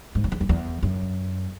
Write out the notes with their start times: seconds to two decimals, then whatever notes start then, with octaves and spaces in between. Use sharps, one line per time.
0.15 G#2
0.24 F#2
0.32 E2
0.41 F#2
0.49 E2
0.83 F#2